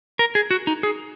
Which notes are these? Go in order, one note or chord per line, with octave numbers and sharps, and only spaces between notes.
A#4
G#4
F#4
D#4
G#4